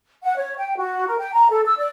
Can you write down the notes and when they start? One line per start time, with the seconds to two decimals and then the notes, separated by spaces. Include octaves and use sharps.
0.24 F#5
0.37 C#5
0.58 G5
0.78 F#4
1.07 A#4
1.19 G5
1.34 A#5
1.50 A4
1.66 E6
1.78 D5